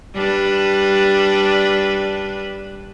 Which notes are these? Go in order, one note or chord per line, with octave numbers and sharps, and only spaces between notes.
G3 D4 B4